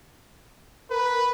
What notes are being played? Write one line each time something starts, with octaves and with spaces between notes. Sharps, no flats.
A#4 B4